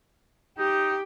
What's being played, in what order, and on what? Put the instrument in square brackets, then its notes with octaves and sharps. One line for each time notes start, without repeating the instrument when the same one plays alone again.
[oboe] D#4 [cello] G4